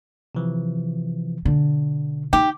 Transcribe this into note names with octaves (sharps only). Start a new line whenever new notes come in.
C3 E3 F3
B2 D3
D#4 G4